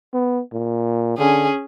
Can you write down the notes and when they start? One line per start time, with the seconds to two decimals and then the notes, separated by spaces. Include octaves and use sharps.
0.14 B3
0.52 A#2
1.18 D3 C#4 G#4